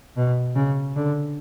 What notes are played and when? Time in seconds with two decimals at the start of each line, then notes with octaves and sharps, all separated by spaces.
0.17 B2
0.56 C#3
0.96 D3